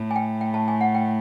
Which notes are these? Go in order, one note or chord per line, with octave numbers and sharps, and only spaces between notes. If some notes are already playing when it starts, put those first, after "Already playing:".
Already playing: A2
G#5
G5
G5
A5
G#5
F#5
G5